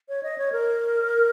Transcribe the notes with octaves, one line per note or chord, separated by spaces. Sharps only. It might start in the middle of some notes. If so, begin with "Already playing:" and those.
C#5
D#5
C#5
A#4